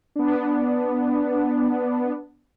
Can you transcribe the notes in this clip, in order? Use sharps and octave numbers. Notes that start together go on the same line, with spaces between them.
B3 D4